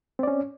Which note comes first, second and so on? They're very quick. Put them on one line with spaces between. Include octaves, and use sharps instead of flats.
C4 D5 C#4